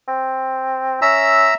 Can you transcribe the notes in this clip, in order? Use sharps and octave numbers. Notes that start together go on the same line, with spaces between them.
C4
C#4 E5 A#5 E6